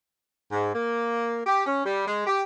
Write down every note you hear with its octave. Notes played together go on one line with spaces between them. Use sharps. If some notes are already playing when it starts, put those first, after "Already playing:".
G#2
A#3
G4
C#4
G3
G#3
G4